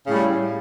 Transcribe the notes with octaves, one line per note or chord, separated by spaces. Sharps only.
A2 C#3 G3